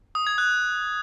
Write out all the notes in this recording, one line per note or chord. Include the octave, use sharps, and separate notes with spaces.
D#6
G#6
F#6